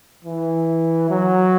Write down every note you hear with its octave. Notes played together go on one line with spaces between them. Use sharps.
E3
F#3